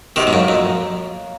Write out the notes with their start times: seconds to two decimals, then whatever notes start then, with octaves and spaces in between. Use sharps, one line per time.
0.16 C3 D#3 F#3
0.27 G#2
0.32 F#2 A#3
0.48 F2 F#3